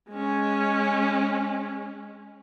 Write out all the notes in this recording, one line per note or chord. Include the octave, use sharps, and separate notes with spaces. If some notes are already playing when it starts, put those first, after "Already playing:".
G#3 C#4